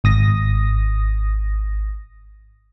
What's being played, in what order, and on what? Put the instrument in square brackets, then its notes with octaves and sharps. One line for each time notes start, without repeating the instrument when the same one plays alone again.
[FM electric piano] G#1 D#6 A#6